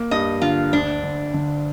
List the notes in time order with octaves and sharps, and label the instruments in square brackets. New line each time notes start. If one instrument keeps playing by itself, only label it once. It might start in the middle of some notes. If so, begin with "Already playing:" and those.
Already playing: [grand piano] A#3
[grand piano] G2 [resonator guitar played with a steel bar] D#5
[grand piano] D3 [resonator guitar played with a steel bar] F4
[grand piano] D2 [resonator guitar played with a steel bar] D4
[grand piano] D2
D3